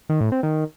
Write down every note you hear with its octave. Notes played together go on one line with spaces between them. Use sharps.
D#3
A2
C4
D#3